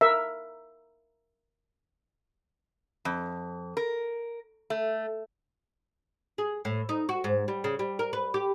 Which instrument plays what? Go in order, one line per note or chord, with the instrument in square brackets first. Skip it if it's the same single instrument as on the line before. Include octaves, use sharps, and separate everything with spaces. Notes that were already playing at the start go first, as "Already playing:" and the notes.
[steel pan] A#4 E5
[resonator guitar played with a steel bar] F2
A#4
A3
[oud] G#4
A2
D#4
F#4
G#2
G3
C#3
G3
A#4
B4
G4